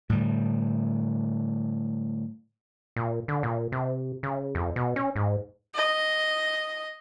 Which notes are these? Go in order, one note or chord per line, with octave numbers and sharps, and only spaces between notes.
A2 D3 G3
A#2
D3
A#2
C3
C#3
F2
B2
C#4
G#2
D#5